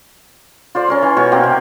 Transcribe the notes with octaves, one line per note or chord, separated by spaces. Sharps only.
F4 C5 D5
C#4 A#4 C#5
E3
B2 A#4 C#6
A#3 C4 G4
C3